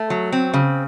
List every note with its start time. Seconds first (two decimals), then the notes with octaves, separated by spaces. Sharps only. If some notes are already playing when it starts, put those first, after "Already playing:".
Already playing: A3
0.10 F#3
0.32 C4
0.54 C#3